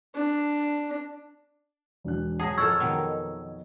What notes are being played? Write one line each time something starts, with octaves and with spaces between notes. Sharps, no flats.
D4
E1 D4 F#6
F#3 G#4 A5 D#6 A#6
F2 A4 A#4 F#5 C#6 E6 G#6
B2 D#3